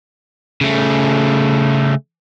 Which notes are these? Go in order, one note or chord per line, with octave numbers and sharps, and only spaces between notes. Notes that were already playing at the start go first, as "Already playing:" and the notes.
C#3 A3